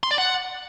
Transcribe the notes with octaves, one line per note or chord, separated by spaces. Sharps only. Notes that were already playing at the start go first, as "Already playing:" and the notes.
C6
D5
F#5